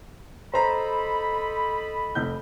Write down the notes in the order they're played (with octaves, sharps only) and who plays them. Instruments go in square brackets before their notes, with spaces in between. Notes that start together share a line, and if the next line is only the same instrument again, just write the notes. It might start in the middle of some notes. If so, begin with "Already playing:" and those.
[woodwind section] A4 D#5 B5 [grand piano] C5 A#5
[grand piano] F1 G6